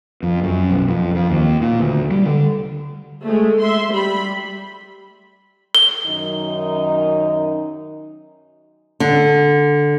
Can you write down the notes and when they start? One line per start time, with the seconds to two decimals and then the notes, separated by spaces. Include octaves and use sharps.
0.23 F2
0.44 F#2
0.71 B1
0.88 F2
1.15 F2
1.30 D#2
1.61 A#2
1.80 D2
2.11 G3
2.25 D3
3.25 G#3 A3
3.61 E5 C6
3.92 G3 B5
5.75 G7
6.06 F#2 D#3 D#4
9.00 D3